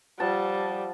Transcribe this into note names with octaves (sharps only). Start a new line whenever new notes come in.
F3 G3 F#5 A5